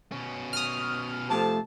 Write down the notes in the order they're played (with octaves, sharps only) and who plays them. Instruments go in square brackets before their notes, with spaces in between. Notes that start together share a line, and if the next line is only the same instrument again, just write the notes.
[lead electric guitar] B2 C#4
[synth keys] D#6 F6
[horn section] C3 F3 A5 [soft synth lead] A3